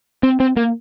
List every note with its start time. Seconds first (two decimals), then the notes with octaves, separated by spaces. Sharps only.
0.23 C4
0.40 C4
0.56 A#3